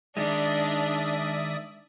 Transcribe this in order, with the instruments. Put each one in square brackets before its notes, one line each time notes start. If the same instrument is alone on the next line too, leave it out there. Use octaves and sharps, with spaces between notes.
[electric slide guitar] D#3 G#3 [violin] D4 [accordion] D5 E5 D#6